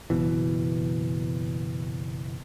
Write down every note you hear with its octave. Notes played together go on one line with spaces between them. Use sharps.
F#1 B2 E3